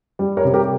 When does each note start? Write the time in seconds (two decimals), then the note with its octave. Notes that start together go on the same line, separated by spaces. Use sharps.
0.19 G3
0.37 A#4 C#5
0.45 C3
0.54 G4 A#4